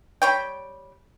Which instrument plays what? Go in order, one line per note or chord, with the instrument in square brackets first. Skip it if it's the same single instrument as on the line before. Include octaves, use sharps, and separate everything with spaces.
[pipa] G3 C#5 G5